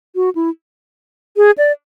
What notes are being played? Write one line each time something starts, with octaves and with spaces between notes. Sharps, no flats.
F#4
E4
G#4
D5